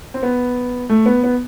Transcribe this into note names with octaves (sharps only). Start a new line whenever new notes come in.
C4
B3
A3
B3
B3